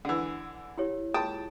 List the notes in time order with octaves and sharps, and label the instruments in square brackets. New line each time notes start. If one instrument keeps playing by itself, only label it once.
[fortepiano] D3 E3 [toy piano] F#5 E6
[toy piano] E4 G4 C#5
[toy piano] F4 G#4 [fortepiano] G5 A5 D#6